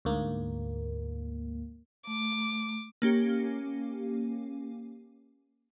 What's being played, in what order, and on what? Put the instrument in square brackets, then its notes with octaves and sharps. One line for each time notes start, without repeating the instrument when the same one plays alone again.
[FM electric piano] D2 G#2 A#3
[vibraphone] A3 [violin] D6
[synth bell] A#3 C#4 G4